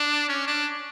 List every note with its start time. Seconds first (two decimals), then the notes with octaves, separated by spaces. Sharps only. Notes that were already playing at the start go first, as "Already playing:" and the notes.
Already playing: D4
0.29 C#4
0.47 D4